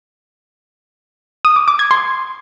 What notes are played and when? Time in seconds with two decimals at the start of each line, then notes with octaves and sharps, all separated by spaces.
1.45 D#6
1.56 D6
1.68 D6
1.79 G#6
1.91 C6